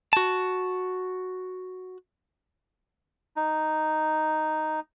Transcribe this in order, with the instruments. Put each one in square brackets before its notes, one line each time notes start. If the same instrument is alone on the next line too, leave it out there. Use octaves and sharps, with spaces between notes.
[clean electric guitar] F#4 A5
[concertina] D#4